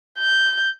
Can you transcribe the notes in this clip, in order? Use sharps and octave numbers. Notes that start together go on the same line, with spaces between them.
G6